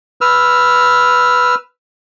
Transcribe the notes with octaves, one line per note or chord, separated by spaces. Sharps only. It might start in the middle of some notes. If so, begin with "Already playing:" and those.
B4 E6 F6